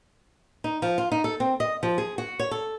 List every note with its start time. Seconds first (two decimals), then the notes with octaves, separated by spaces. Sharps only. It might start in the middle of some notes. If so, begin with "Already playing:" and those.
0.64 D#4
0.82 F3
0.98 F4
1.12 D#4
1.24 A4
1.40 C4
1.60 D#5
1.83 F3
1.98 G#4
2.18 F#4
2.39 C#5
2.51 A4